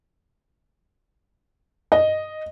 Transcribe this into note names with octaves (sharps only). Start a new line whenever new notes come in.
D#5